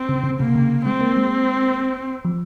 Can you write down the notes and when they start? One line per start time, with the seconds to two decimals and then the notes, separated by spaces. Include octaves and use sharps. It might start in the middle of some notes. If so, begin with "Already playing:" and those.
Already playing: C4
0.09 C#3
0.24 C#3
0.39 C3 A#3
0.55 C#3
0.85 G#3 C4
1.01 A#3
1.17 G#3
2.25 F3